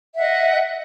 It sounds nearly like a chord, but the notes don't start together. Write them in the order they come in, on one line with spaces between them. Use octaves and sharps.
E5 F#5 D#5